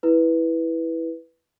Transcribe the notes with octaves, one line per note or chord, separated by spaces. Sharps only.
E4 B4